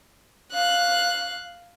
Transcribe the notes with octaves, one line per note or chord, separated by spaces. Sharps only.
F5 F#6